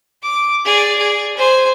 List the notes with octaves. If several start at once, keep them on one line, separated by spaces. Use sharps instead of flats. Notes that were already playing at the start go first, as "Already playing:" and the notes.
D6
G#4 D5
G#4
C5 G#5